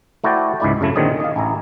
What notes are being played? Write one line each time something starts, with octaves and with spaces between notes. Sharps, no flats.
A3 E4 F#4 C5 D5 G5
C#2 G#2 G#3 E4 D5 E5
F#2 C#3 A3 E4
A#2 D3 D#3 C4 C#4 G#4
D#5 F5
A1 E4 G#5 A#5